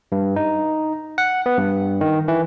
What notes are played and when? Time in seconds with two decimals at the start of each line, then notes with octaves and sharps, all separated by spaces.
0.12 G2
0.36 D#4
1.18 F#5
1.46 B3
1.57 G2
2.01 D#3
2.28 E3